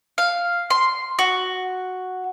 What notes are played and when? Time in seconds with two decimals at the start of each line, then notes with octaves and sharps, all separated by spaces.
0.18 F5
0.70 C6
1.19 F#4